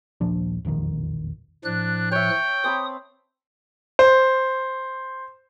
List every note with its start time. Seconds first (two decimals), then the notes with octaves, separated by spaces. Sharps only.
0.21 D#1 A#1 F3 D4
0.65 E1 A#1 F2 D#3
1.65 A2 F3 D4 F#6
2.12 C#5 E5 G5
2.64 C4 A5 B5 D#6
3.99 C5